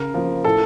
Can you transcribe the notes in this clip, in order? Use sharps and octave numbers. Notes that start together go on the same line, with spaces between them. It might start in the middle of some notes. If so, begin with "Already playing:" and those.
Already playing: C#3 A#4
F3 A#3
A2 A4